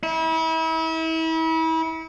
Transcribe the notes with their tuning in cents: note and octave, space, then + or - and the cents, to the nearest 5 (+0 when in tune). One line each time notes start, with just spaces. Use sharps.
E4 -35